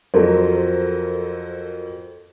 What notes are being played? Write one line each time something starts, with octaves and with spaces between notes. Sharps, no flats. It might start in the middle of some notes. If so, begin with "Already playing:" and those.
F2 F#3 A4 A#4 C5